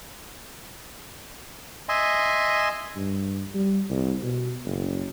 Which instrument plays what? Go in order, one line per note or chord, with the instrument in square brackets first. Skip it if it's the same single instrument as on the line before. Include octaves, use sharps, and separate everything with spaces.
[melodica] D#5 E5 G#5 C6
[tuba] G2
G3
C2
B2
F#1